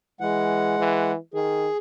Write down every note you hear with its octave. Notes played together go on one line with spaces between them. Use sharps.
E3 G#3 F#5
E3
D#3 G#4